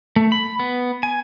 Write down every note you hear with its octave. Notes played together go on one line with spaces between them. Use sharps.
A3
B5
B3
G#5